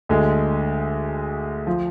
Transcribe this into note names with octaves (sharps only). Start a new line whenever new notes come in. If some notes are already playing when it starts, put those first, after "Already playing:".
D2 D3 G#3
F3